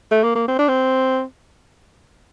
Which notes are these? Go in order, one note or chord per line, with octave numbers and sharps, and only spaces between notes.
A3
A#3
A#3
C4
D4
C4